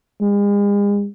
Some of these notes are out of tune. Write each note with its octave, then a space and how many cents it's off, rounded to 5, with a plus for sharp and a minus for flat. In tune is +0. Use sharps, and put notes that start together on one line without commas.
G#3 -40